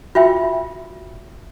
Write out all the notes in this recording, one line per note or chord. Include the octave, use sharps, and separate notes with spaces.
F4 F#4 E5 G5